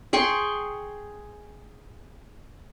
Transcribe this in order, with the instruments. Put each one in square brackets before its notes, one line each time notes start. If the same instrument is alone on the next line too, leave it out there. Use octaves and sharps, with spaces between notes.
[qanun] G#4 G5 C6 C#6